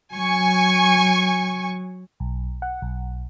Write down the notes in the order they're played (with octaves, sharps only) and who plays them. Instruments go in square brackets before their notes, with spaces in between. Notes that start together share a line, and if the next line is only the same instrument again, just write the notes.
[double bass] F#3 [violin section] G#5 C#6
[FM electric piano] B1
F#5
B1